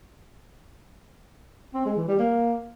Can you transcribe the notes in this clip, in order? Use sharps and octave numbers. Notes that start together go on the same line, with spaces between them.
C4
G#3
E3
G3
A#3